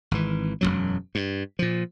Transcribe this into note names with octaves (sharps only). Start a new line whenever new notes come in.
G#1 E3
E1 B1 F#2 F#3
G2
A#2 F3